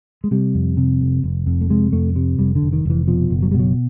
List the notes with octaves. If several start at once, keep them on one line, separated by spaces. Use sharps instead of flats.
G#3
C3 G3
F2
C3
F1
F1
F2
A3
C3 G#3
F2 A3
C3
F1 G3
D3
F1
D#3
F1 E3
B2 F3
F#1
F#3
G3
B2 F#3